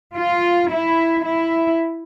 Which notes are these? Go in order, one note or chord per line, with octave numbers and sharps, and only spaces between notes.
F4
E4
E4